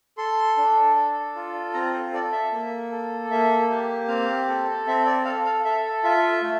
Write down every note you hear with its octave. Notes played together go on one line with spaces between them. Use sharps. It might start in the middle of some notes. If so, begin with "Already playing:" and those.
A4 C6
D4
A4
F4
C4 A#5
C5
A4 D5
E5
A#3
A4
A#3 E5
G4
C4 F5
A4
C4 E5
D5
A4 F5
F5
A4 E5
F4 E5
A3